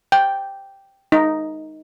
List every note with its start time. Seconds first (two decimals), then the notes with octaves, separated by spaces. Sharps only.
0.12 G5
1.12 D#4